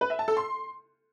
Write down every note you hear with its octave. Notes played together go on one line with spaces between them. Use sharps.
B4
E5
A5
A4
C6